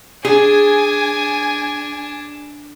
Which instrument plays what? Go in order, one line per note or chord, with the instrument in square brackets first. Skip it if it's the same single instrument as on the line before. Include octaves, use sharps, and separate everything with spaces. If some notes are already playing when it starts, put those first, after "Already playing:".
[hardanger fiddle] D4 [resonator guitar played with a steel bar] G#4 [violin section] G#5